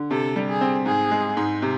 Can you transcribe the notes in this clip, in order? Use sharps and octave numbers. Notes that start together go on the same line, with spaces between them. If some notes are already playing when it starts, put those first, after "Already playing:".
Already playing: D3
C3 A4
G3
G#4
C4
G#2 G#4
G#3
G#2
C3